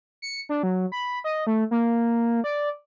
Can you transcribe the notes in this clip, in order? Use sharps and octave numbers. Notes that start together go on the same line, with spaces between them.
C#7
D4
F#3
B5
D#5
A3
A#3
D5